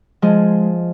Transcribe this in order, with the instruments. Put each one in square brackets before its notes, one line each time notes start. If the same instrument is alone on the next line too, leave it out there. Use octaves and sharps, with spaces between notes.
[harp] F3 G#3 G#4